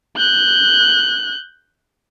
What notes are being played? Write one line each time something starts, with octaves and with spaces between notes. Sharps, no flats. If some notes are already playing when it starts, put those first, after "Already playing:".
F#6 G6